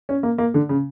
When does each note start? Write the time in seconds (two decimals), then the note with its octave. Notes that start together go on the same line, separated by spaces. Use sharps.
0.09 C#4
0.23 A#3
0.38 A#3
0.54 D3
0.69 C#3